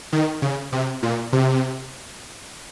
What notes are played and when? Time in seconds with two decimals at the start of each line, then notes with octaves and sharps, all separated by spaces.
0.13 D#3
0.42 C#3
0.72 C3
1.03 A#2
1.33 C3